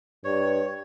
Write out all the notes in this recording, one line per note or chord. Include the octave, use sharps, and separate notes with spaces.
G2 C#5